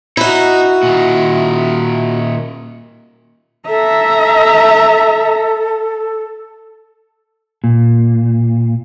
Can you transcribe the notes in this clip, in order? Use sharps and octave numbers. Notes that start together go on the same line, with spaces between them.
D#4 E4 F#4
A#2 D#3
A4 E5 A#5
A#2